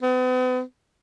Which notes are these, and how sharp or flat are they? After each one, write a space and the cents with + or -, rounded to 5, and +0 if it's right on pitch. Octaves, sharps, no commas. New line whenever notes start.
B3 +45